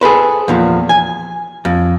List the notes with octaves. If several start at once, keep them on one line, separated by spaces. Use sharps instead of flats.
G#4 A4 B4 C5
E2 A#2 F3
G#5
F2